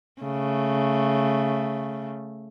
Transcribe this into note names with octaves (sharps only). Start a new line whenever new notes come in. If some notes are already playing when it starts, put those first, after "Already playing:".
C#3 A3